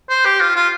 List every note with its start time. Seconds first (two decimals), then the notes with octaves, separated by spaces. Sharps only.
0.09 C5
0.25 G4
0.40 F4
0.56 F4